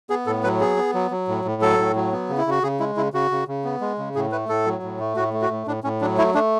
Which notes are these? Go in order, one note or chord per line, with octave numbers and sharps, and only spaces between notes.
B3 G#4
A2 A4
F#3 B4
B3 G#4
B3
F#3
F#3
A2
A2
F#3 A4
A2
F#3
B3
C#3
E4
C#3 F#4
C#3 G#4
G#3 E4
C#3 E4
C#3 F#4
C#3
C#3
B3
G#3
C#3
A2 G#4
A3 B4
A2 A4
F#3
A2
A3
A2 F#4
A3
F#4
A2
A2 D4
A2 C#4
F#3 D4
A3 E4
A3 D4